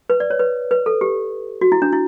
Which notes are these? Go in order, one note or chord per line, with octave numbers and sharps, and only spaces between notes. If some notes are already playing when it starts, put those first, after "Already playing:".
B4
D5
C#5
B4
B4
A4
G4
F#4
E4
D4
E4